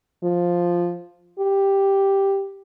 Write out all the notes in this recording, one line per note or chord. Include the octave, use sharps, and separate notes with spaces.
F3
G4